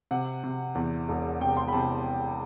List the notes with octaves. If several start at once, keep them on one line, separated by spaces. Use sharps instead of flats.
C3 F#5
C3
E2
E1
C3 G5
C6
B5
C3 A5